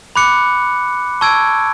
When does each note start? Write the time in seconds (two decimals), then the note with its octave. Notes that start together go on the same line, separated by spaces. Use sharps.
0.16 B5 D6 F#6 C#7
1.21 A5 C#6 E6 G#6 D7